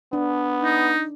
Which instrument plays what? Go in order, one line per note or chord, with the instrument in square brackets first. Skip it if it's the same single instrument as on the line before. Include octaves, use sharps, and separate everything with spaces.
[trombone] B3 [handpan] D4
[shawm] D#4